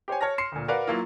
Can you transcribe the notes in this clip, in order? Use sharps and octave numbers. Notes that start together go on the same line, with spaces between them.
G4 C5 C#5 G#5
C#5 A5 F6 A#6
C6 C7 C#7 E7
D2 A#2
F#4 A#4 B4 D5 F5 F#5
F#3 A#3 E4 F4